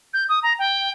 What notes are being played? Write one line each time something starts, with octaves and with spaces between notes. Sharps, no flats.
G6
D#6
A#5
G5